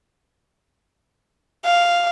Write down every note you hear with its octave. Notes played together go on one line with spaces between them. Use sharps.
F5